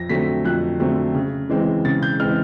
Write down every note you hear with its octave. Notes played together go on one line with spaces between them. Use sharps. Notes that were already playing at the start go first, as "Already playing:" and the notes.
Already playing: F2 A#6
D3 F#3 A3 C4 B6
F2 F#6
D3 F#3 A3 C4
C#3
E3 G#3 C4
C#3 A6
G6
E3 G#3 C4 F6